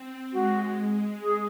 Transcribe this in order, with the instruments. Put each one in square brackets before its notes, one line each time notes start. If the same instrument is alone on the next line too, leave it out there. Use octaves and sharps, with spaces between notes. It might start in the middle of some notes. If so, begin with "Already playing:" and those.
Already playing: [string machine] C4
[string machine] G#3 [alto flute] F#4
[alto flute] G#4